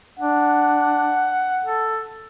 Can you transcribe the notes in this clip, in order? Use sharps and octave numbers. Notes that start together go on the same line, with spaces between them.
D4 F#5
A4